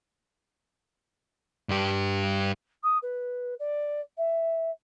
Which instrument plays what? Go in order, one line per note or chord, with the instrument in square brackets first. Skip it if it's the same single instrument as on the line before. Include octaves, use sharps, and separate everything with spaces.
[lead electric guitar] G2 G4
[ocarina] D#6
B4
D5
E5